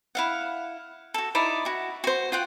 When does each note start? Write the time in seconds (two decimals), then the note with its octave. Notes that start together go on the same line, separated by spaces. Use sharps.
0.15 E4 F5 F#5
1.14 F#4 A4
1.35 D#4 E4 D5
1.65 E4 F#4
2.04 F#4 C5
2.32 F4 F#5 G5